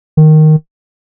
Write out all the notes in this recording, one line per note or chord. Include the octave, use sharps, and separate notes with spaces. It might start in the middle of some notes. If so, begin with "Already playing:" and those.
D#3